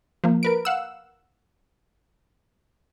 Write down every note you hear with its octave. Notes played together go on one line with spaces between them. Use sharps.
F3 A#3
A#4 B4 D7
F5 F#5 E6